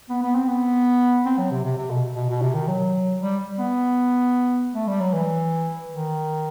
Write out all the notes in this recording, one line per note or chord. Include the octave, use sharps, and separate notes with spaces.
B3
B3
C4
B3
C4
F#3
C3
C3
C3
B2
B2
B2
C3
D#3
F#3
G3
B3
A3
G3
F#3
E3
D#3